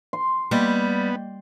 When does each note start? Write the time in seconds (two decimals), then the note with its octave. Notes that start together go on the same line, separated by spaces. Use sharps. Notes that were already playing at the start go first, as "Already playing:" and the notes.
0.13 C6
0.51 G3 A#3 B3 D#5